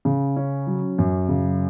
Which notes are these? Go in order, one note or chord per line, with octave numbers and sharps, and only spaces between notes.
C#3
C#4
F#3
F#2
C#3